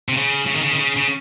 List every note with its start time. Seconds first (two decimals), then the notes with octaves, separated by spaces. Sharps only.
0.09 C3
0.17 C#3
0.46 C#3
0.55 D#3
0.61 C#3
0.71 D#3
0.76 C#3
0.96 C#3